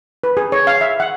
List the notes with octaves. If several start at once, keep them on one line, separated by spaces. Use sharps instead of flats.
B4
G#4
C#5
F5
E5
F#5